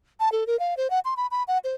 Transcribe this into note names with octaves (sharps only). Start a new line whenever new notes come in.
A5
A4
A#4
F5
C5
F#5
C6
B5
B5
F#5
C5